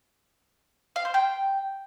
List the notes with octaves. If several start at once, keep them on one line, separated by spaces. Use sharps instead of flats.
F5
C5
G5